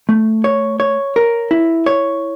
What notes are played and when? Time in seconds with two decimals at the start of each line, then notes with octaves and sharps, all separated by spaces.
0.09 A3
0.44 C#5
0.80 C#5
1.16 A#4
1.51 E4
1.86 C#5